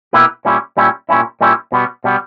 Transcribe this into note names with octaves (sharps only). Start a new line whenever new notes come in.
B2 A#3 E4 G4 B4
A#2 G3 C#4 E4
A#2 G3 C#4 E4
A#2 G3 C#4 E4
A#2 G3 C#4 E4
B2 G3 B3
B2 G3 B3